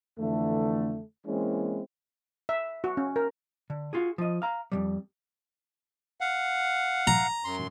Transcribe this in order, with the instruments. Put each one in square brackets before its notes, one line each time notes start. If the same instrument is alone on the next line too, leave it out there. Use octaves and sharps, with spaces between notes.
[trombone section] F2 D3 E3 A3
E3 G#3 A#3 C4 C#4 E4
[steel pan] E5
F#4
C#4
A#4
[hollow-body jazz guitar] D3
F4 F#4 G#4
F3 D#5
F5 A#5
F2 E3 G3
[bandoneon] F5 F#5
[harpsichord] A#5
[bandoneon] F#2 C6